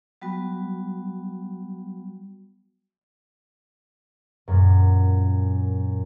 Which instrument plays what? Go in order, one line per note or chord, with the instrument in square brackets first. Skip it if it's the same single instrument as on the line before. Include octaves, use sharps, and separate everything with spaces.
[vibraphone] F#3 G3 B3 F#4
[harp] F#2 A#2